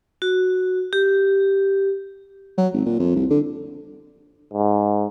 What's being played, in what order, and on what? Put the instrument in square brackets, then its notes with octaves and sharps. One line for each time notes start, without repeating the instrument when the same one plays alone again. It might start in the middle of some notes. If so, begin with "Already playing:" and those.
[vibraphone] F#4
G4
[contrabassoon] F#3
G#1
A#2
F2
C2
D3
[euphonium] G#2